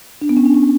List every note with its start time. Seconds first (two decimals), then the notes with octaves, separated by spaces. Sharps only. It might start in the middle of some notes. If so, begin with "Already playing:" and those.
0.22 D4
0.29 B3
0.37 C#4
0.46 D4
0.54 C#4